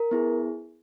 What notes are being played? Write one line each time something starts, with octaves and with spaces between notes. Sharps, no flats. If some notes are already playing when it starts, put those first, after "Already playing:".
Already playing: A#4
B3 E4 G#4